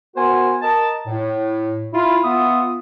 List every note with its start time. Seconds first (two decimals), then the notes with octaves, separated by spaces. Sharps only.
0.16 B3 F#4 A#4 C5 G#5
0.61 A#4 D#5 A5
1.08 A2
1.94 E4 F4
2.24 B3 F4 E5 D#6